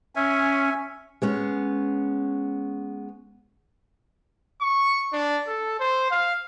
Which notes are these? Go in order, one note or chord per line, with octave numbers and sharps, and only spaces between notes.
C#4 E5 G#5
G#3 B3 C#4
C#6
D4
A4
C5
F5